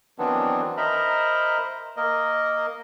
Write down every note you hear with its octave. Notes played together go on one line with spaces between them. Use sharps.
D#3 E3 F#3 B3 C4 D4
A#4 C5 D#5 E5 A#5 B5
A#3 A#4 D#5